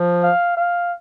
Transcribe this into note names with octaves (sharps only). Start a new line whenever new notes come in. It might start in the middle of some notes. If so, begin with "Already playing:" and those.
Already playing: F3
F5
F5